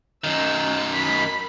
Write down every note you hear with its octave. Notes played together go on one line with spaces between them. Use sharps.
F#2 D#3 E6
B5 B6